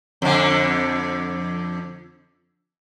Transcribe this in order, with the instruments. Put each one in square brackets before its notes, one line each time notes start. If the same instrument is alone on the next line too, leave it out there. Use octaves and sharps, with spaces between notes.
[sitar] F2 D3